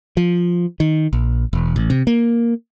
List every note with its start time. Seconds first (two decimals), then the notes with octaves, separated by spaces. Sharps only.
0.17 F3
0.80 D#3
1.13 A#1
1.53 E1
1.76 A1
1.90 C3
2.07 A#3